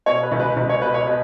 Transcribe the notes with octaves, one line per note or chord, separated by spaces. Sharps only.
B2 C#5
B4
C#2
B4
C#2 B4
C#5
B2 B4
C#5
B2 B4